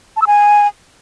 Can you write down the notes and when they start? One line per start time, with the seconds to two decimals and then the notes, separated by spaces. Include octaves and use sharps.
0.16 A5
0.22 E6
0.27 G#5